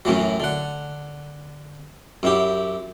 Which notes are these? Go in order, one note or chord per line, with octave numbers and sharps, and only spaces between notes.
F#2 A2 E3 F#3
D3 F#5
F#2 E4 G4